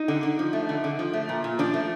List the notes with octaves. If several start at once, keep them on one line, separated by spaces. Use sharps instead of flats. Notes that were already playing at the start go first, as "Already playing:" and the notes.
Already playing: D#4
D3
D3
F3
A3
D3
D3
F3
A3
A#2
A#2
F3 D4
A3